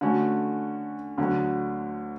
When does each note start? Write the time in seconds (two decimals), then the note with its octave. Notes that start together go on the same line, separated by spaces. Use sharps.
0.01 D3 A3 C#4 F#4
1.18 D2 D3 F#3